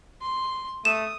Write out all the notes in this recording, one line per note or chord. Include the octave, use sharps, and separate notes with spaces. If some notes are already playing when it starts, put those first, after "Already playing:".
C6
A3 D#6 E7